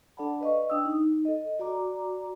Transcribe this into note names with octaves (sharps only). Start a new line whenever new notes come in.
D4 A4 D5 F#5 A5 B5
B4 D5 D#5 F5 C#6
D4 G5 D#6 E6
D#4
A4 D#5
F#4 D5 A#5 D6